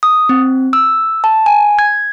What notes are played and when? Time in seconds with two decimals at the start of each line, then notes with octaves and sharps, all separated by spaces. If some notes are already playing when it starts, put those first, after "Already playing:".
0.03 D#6
0.29 C4
0.73 E6
1.24 A5
1.46 G#5
1.79 G#6